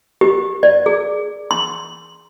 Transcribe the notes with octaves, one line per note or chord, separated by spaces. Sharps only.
G4
D5
G#4
C6